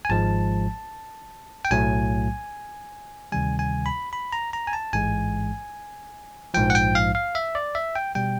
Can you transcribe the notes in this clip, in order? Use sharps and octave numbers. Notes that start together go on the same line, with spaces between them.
G#5
G#1 G#2 F3 G#3 A5
G5
B1 A2 F#3 A3 G#5
D2 C3 D#3 G3 G#5
G#5
B5
B5
A#5
A#5
G#5
A5
A1 G#2 E3 G#3 G#5
A#1 G#2 F3 G5
F#5
G5
F5
F5
E5
D5
E5
G5
B2 G3 G5